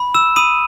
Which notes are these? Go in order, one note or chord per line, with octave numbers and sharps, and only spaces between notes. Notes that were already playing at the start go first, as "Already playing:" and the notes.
Already playing: B5
E6 E7
B5 D#6 D#7